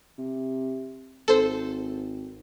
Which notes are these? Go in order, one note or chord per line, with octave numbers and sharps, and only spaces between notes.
C3
G#1 A4 C5